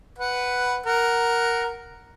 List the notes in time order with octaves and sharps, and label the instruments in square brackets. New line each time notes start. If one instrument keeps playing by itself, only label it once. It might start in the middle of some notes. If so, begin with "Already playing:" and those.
[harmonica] B4 F#5
A#4 F#5